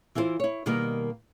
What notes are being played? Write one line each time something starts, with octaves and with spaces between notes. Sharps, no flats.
E3 E4 F4 A#4 C5
E4 C#5
B2 D#3 G3 A#3 A#4